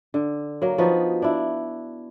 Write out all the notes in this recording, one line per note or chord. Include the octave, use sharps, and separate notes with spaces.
D3
F#3 A#3
F3 B3 D#4 F#4
D4 E4